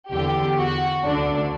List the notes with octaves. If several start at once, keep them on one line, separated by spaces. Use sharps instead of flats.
E2 D3 G4
F#4
D2 D3 D4